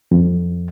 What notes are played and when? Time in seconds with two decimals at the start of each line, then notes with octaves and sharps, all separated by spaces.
0.11 F2